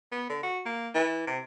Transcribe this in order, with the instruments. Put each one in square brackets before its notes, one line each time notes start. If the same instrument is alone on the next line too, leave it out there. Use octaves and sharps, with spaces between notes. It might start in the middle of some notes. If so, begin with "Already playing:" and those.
[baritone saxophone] B3
D3
F#4
A#3
E3
C3